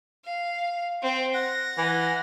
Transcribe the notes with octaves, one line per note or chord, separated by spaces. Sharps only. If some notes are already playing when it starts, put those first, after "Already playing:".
F5
C4 G5
F#5 A#6
E3